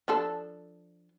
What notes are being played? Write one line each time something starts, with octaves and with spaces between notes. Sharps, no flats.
F3 D4 A4